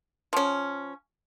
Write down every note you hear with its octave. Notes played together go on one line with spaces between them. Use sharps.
F3 C#4